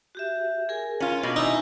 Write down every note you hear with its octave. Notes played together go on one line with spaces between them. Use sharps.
F#4 G4 E5
G#4 A#4 G#5
C#4 F4
B2 C#4 D4 F4
D#4 E4 E5 G#5